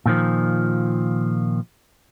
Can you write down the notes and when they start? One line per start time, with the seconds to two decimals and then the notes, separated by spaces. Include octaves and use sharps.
0.06 A#2 D#3 F3